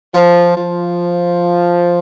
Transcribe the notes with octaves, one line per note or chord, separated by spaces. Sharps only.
F3
F3